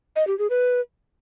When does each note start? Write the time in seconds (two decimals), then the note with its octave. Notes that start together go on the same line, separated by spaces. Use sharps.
0.16 D#5
0.27 G4
0.39 G#4
0.50 B4